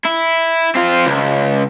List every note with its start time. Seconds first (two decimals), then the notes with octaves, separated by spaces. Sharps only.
0.05 E4
0.75 C4 F4
1.05 C#2